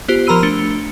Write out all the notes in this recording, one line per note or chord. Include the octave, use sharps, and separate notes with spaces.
B3 F4 G4 C5
F3 A#4 A#5 B5 E6 D#7
A3 D4 C#7 G7